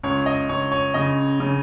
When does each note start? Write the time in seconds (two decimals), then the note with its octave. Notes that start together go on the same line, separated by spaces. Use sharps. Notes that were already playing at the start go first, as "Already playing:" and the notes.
0.04 C#2 C#5
0.26 D#5
0.49 C#2 C#5
0.72 C#5
0.94 C#3 D#5
1.40 C#3